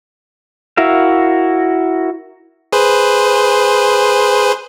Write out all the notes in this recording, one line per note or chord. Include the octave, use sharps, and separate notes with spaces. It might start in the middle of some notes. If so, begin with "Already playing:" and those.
E4 F#4 A#4 E5 F5
G#4 B4 C5